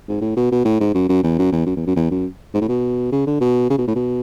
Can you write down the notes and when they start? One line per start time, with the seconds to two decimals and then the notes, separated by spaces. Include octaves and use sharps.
0.08 G#2
0.21 A2
0.37 B2
0.52 B2
0.65 A2
0.80 G#2
0.94 F#2
1.09 F#2
1.23 E2
1.39 F#2
1.52 E2
1.66 F#2
1.76 E2
1.86 F#2
1.96 E2
2.11 F#2
2.54 G#2
2.61 A2
2.69 B2
3.12 C#3
3.26 D3
3.40 B2
3.70 C#3
3.78 B2
3.87 A2
3.95 B2